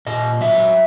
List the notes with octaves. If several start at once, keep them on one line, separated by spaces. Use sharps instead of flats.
A#2 D#5
F#3 E5